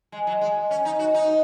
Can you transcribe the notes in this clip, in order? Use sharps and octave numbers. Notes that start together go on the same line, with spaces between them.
G#3
F#3
G#3
C#4
D#4
F#4
D#4